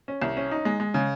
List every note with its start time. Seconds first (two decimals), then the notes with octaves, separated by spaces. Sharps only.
0.08 C#4
0.22 C2
0.37 C#4
0.51 D#4
0.65 G#3
0.80 G#3
0.94 C#3